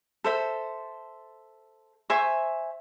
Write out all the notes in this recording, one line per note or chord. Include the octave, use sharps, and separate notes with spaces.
A4 C5 E5
C5 E5 G#5 C#6